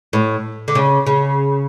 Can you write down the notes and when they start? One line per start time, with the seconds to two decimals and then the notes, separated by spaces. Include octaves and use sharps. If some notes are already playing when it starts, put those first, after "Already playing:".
0.13 A2
0.68 D3
0.75 C#3
1.06 C#3